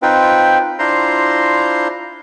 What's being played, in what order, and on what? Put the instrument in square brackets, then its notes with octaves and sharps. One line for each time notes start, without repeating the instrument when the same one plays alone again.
[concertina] C4 D#4 F4 B4 G5
D4 E4 F4 C5 A#5 C6